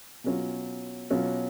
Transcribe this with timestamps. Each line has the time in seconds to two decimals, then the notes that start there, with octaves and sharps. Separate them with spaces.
0.24 B2 F#3 C#4 F4
1.10 B2 F#3 C#4 F4